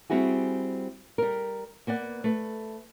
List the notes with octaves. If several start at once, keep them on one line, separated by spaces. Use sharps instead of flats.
G3 C4 E4 F#4 G#4
G3 A#4
A#3 B3 D5 F#5
A3 B4